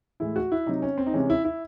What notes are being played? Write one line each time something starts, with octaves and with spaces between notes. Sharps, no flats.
A2 E3 G#3 E4
F#4
E4
C3 F#3 D#4
C#4
C4
D#4
C3 E3 G#3 C#4
E4
E4